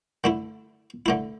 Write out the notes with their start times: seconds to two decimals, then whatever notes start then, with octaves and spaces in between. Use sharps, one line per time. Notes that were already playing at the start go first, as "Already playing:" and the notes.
0.24 D3 A3 E4
1.06 D3 A3 E4